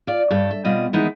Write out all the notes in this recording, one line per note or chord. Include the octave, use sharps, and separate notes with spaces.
F4 D5
G2 G4 A4 C#5
E5
B2 G3 C4 F4 D#5
D#3 E3 G#3 B3 D#4 E4